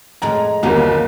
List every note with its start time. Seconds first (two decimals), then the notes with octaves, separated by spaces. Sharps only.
0.22 F2 A2 G#3 A#5
0.63 G1 D#2 F#3 A#3 D#4